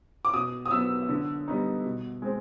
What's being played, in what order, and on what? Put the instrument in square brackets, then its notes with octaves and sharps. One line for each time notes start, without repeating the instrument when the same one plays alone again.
[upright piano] D6
B2 D#6
D#6
F#3 B3 E6
D3
G3 B3 D#4
B2
G#3 C4